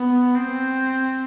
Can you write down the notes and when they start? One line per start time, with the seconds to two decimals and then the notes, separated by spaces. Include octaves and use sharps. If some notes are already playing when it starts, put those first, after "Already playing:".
Already playing: B3
0.35 C4